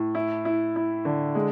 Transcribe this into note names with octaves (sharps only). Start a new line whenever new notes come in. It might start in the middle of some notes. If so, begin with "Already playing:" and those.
Already playing: A2
E4
E4
E4
D3
G#3